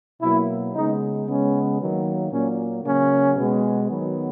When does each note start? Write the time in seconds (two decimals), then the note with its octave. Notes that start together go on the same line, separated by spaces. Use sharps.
0.21 B2 F#3 A#3 E4
0.74 C#3 G#3 B3 D#4
1.27 C#3 G#3 B3 C#4
1.79 D#3 F#3 A#3
2.31 A#2 F#3 A#3 C#4
2.84 C#3 F#3 A#3 C#4
3.37 B2 G#3 B3
3.89 D#3 F#3 B3